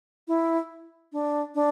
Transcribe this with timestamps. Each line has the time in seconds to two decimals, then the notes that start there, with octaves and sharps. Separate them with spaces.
0.28 E4
1.12 D4
1.55 D4